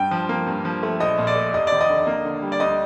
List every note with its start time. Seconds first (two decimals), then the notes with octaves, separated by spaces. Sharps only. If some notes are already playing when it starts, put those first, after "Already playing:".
Already playing: G2 G5
0.11 F3
0.29 A#3
0.46 G2
0.65 F3
0.83 A3
1.00 A#1 D#5
1.18 A#2
1.27 D5
1.36 A3
1.54 F1 D#5
1.67 D#2 D5
1.81 D#5
1.90 D3
2.07 A#3
2.25 D3
2.42 G3
2.52 D5
2.60 D2 D#5